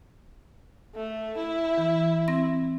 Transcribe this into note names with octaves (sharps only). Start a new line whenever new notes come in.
A3
E4
E3
C4 A#6